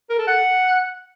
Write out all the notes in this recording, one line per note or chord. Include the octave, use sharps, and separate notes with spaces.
A#4
A4
F#5